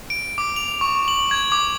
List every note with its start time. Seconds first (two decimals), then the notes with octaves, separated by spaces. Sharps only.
0.10 D7
0.38 D6
0.56 F7
0.81 C#6
1.08 F#7
1.31 G#6
1.52 D6